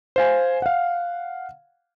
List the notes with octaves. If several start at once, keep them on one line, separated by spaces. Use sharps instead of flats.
C5 F5 G#5
F5 F#5